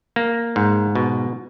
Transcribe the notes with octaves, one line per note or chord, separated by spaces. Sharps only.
A#3
G#2
B2